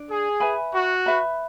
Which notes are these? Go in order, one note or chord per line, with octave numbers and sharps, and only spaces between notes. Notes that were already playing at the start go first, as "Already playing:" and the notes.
Already playing: D4 D5
G#4
B4 E5 G#5 B5
F#4
B4 E5 B5